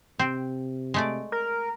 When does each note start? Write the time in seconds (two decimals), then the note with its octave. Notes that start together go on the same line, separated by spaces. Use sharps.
0.19 C3 C4
0.94 G#3 A3 D5
1.32 A#4